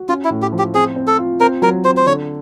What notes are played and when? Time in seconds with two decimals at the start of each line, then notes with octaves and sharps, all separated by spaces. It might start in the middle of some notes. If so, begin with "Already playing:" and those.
Already playing: F#4
0.09 C#4 F4
0.24 E4
0.30 A2
0.42 G4
0.52 F3
0.59 G4
0.74 C4 G#4
0.96 C4
1.07 A4
1.18 F4
1.40 C4 A#4
1.62 F#3 A#4
1.84 C4 C5
1.97 C5
2.06 D3 C#5